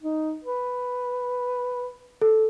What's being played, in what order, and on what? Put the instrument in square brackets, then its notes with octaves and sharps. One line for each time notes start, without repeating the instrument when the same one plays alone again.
[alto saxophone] D#4
B4
[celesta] A4